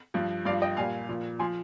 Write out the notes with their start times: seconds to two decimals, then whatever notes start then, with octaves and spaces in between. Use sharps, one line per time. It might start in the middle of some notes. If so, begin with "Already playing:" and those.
0.14 G2 F3
0.45 G2 F3 D5 F5
0.62 D#5 G5
0.77 A#2 G3 F5 G#5
1.09 A#2 F3
1.39 F3 G#5 C6